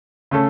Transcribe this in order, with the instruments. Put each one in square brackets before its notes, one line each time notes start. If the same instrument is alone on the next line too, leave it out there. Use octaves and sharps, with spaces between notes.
[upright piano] C#3 A3 C#4 A4